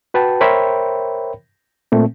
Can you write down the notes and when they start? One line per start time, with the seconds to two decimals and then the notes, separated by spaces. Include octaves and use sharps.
0.14 F#4 B4 G5 A5
0.41 A#4 C5 C#5 E5 G5 B5
1.92 A#2 A3 C4